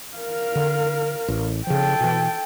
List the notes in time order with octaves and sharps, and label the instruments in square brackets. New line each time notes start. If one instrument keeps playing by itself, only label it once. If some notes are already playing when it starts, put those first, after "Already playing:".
[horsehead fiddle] A#4 F5
[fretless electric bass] D3
A1
[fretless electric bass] C#3 F3 [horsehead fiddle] A4 G5
[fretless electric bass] B2 E3